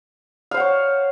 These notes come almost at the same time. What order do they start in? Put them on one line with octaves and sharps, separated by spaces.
F5 C5 F#5 C#5